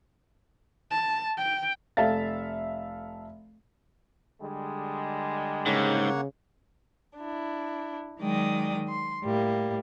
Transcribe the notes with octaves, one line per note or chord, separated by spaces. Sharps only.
A5
G5
F1 A4 E5 F5 A6
D3 G3 G#3
G#2 C#3 A#3 C#5 F#5
D4 E4
D#3 F#3 G#3 D5 G5 D#6
C6
A2 G3 A#3